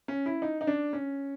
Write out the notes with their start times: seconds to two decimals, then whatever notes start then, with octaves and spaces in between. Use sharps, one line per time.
0.08 C#4
0.26 E4
0.42 D#4
0.61 D#4
0.67 D4
0.93 C#4